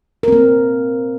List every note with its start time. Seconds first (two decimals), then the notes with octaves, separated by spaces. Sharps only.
0.23 A#4
0.28 C4
0.32 A#3